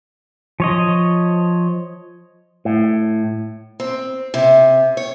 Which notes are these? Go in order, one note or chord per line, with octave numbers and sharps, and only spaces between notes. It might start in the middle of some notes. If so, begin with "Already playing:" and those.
F3 C#5 D#5
A2
C4
C3
C#5